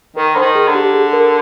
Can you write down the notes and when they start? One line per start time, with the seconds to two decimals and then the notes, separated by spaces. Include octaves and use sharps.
0.17 D#3 A#4
0.35 D3 C5
0.42 D#3
0.55 G#4
0.68 D3
0.75 G4
0.94 G#4
1.13 A#4